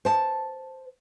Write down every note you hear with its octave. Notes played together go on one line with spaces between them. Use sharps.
C5 A5